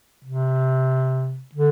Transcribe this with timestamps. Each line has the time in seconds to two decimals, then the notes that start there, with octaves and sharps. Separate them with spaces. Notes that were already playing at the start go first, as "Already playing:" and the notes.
0.25 C3
1.55 D3